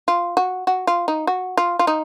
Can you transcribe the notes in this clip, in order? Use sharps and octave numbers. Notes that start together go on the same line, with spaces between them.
F4
F#4
F#4
F4
D#4
F#4
F4
F4
D#4